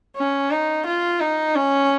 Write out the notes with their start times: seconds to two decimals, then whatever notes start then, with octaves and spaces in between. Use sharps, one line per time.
0.17 C#4
0.51 D#4
0.86 F4
1.20 D#4
1.56 C#4